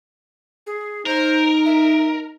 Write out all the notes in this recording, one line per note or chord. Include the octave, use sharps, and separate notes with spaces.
G#4
D#4 A#4 C5
E5